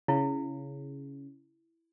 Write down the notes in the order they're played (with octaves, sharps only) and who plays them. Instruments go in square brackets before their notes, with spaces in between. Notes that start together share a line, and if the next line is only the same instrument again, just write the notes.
[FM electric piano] C#3 [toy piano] E4